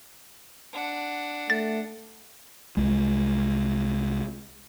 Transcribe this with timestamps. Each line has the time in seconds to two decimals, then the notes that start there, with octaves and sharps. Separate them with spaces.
0.73 D4 F#5
1.50 A3 A6
2.77 C2 G#3